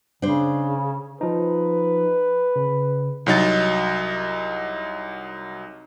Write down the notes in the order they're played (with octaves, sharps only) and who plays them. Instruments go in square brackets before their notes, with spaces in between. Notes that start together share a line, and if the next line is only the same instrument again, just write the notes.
[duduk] C#3 [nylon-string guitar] D4 C5
[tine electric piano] F3 D#4 [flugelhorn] B4
[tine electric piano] C#3
[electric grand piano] C2 F#3 D#4 A6